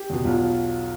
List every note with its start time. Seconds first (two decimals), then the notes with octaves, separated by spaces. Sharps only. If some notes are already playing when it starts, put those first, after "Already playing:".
Already playing: G4
0.10 E2 B2
0.25 B1 F4